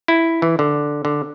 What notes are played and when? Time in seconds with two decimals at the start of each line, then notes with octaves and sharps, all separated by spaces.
0.08 E4
0.42 E3
0.59 D3
1.05 D3